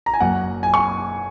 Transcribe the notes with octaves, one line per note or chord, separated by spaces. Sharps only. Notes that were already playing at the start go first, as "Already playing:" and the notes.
A#5
G#5
F#1 F#2 F#3 A#3 F#5
G#5
C#6